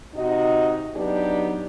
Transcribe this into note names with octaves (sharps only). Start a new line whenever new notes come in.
C3 D#4 F#4 D#5
F#3 B3 D4 D#4 G4